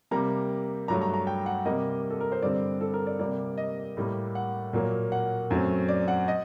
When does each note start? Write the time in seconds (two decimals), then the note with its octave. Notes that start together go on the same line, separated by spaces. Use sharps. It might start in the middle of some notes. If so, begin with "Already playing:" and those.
0.11 C3 G3 A#3 A#5
0.88 G2 F#3 A3 A#5
1.02 A#5
1.14 A#5
1.27 G5
1.46 F#5
1.66 C3 G3 A#3 D#5
2.10 A4
2.20 A#4
2.32 C5
2.42 G2 D3 G3 C4 D5
2.81 A4
2.94 A#4
3.07 D5
3.19 C3 G3 A#3 D5
3.58 D#5
3.97 A2 G3 A#3
4.35 F#5
4.73 A#2 F#3 A#3
5.12 F#5
5.50 F#2 F#3 A3 C4
5.88 D5
6.08 F#5
6.28 D#5